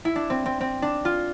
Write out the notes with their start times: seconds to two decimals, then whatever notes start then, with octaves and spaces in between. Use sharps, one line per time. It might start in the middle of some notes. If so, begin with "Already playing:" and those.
0.05 E4
0.16 D4
0.30 C4
0.46 C4
0.61 C4
0.82 D4
1.05 F4